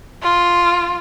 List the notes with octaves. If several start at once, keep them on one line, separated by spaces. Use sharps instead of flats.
F4